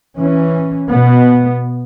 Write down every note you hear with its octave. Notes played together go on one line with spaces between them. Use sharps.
E3 C#4
B2 B3